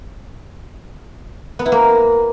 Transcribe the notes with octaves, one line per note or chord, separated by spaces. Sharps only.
B3
E4
A#3